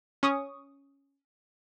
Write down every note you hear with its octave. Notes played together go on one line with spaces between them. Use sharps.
C#4 C#6 D#6